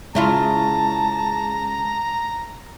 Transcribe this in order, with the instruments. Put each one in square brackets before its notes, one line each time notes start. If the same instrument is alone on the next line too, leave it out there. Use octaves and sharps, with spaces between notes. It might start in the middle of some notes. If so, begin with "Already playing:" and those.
[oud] C#3 E4 F4 [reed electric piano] G#3 [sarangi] A5 [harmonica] A#5